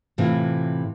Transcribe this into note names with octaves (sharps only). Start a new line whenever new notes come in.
A2 C3 E3 C4 F4